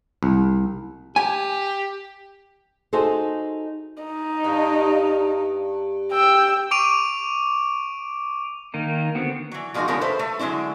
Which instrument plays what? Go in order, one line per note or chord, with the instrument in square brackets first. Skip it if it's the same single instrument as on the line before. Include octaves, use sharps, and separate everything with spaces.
[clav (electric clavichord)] C2
[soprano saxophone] G4 [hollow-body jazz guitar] G#5
[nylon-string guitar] D#4 F#4 G#4 A4 C5
[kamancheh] D#4
[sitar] G2
[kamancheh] G5 E6
[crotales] C#6 D6 D7 D#7 F7
[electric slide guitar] D#3 A#3 D#4
D3 B3 C4 F#4
[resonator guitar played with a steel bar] E3 F#3
F3 G3 G#3 A#3 D#4 F#4
D3 F3 B3 G#4 A#4 C#5
A4 B4 C5 E5
A3
D3 F#3 G#3 C#4 E4